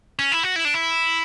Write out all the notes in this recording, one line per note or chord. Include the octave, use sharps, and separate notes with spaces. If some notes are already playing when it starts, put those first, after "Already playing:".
C#4
E4
F#4
E4
D4
E4